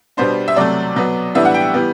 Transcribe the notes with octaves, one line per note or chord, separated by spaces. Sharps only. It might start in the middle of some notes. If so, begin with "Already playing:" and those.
B2 G3 B3 D4 C5
E5
C3 F#3 A3 D5
B2 F#3 B3
A2 E3 G3 B3 D4 E5
F#5
G5
E3 G3 B3